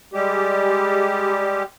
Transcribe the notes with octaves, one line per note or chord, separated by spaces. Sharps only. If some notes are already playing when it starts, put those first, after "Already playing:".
G3 G#3 G4